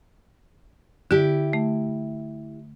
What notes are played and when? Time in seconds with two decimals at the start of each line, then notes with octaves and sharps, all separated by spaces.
1.11 D3 E4 G4
1.53 A3